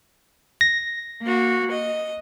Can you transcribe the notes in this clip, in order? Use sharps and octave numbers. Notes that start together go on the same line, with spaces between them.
A#6
A#3 F#4
D#5